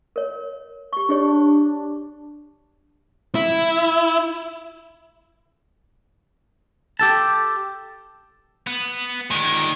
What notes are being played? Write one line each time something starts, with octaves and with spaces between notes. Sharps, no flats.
A#4 C#5
G4 C#6
D4 G4 G#4 C#5
E4
G4 A4 A5
B3
A#2 D#3 G#3